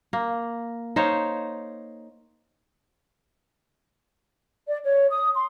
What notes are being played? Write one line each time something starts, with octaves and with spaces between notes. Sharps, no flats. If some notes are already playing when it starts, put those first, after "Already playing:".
A#3
D#4 C5 C#5 F5
D5
C#5
D#6
C6